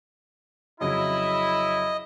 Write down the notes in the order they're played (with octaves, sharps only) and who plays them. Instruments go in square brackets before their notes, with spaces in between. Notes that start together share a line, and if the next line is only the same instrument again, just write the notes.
[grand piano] F2 C#3 F#3 [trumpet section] E4 [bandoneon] D#5